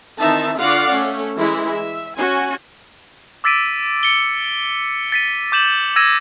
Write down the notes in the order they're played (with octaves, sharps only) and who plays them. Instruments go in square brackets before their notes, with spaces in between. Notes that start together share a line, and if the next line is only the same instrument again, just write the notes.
[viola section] D#3 E3 C4 D#4 E5 A5
D3 F4 F#4 D5 F5 F#5
A3 C#4
E3 G#3 E4
E5
C#4 F#4 G#5
[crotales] D6 E6 A6 B6 D7 D#7
C#7 G7
A6 B6 D#7
D6 G6 E7 F#7
E6 G#6 A#6 D#7 E7